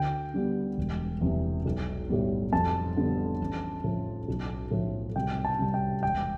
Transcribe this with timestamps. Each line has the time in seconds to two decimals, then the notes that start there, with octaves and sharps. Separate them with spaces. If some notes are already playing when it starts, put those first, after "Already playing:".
Already playing: D2 G5
0.34 D3 G3 B3
0.78 E1
1.21 E2 C3 E3
1.65 B1
2.09 A2 G3 B3
2.52 F2 A5
2.96 D3 G3 B3
3.40 A1
3.84 A2 F3
4.28 B1
4.71 A2 F3
5.16 C2 G5
5.45 A5
5.59 C3 G3
5.74 G5
6.03 E1 G5